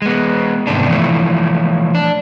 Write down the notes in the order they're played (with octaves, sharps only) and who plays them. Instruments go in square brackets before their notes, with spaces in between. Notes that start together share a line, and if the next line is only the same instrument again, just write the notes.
[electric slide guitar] G#3 B3
G#2 C3 D#3 A3 B3 D4
E3 F3 A3 E4
D4